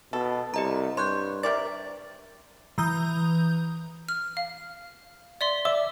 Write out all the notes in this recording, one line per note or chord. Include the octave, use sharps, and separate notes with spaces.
B2 A4
C2 G4 D#5 A#5
G2 C#5 C6 F#6 G6
C3 A#4 D5 A6
E3 A#5 D#6 G6
F6
F5
D5 E5 C6
D5 E5 D6